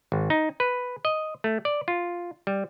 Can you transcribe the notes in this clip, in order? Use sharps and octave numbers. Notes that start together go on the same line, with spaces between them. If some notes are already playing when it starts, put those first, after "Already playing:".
G#1
D#4
B4
D#5
A3
D5
F4
G3